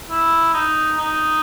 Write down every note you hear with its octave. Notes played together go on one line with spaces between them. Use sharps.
E4
D#4
D#4